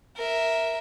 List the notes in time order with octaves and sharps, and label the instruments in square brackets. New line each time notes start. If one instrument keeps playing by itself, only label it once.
[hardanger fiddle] A#4 E5